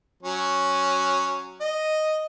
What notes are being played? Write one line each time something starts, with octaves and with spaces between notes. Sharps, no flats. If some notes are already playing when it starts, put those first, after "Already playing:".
F#3 C#4
D#5